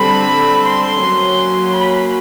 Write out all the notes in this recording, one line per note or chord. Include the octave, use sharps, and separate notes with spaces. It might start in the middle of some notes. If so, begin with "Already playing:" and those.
Already playing: D3 G3 C4 B5
C6
F#3 A#3 C#4
B5